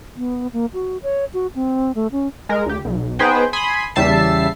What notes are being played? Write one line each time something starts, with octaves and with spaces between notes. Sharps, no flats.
B3
A#3
F#4
C#5
F#4
C4
A3
C#4
G#3 A#4
D2 G4
B1
B3 D#4 G#4 B4 C5 G5
G#5 B5 C6 D#6
E2 C#3 G3 E5 A5 C7